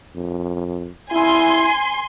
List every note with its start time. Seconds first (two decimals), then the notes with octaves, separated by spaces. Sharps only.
0.16 F2
1.11 E4 G#5 C6